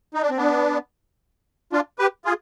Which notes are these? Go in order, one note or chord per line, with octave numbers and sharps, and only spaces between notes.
D#4
D4
C4
B3 D4
D4 F4
G4 B4
F4 G#4